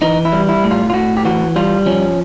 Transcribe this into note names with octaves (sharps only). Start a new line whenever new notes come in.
E3 D#4
E4
G3
E4
A2
F4
F4
A2 F#4
G4
E3 F#4
G3 F4
F3 C#4